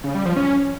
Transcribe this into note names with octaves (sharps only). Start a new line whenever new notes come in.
C#3
G3
F3
C#4